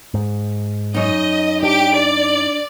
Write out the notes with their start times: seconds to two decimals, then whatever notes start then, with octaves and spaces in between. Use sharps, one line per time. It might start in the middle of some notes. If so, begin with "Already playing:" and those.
0.14 G#2
0.94 F#2 D#4 D#5
1.63 D4 G4 D7
1.95 D5